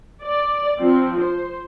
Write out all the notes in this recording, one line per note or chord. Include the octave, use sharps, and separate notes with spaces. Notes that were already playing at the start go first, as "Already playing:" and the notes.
D5
F3 C4
C5